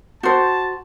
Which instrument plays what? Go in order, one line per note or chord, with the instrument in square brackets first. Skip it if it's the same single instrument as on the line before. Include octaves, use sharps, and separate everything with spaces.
[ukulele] F#4 C5 [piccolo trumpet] A5